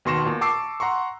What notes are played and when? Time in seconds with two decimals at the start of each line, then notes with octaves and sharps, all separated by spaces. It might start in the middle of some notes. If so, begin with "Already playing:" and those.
0.05 D#2 B2 C6 C#6 A#6 E7
0.26 A#2
0.41 A5 C#6 D6 E6 C7
0.80 F#5 A#5 C6 C#6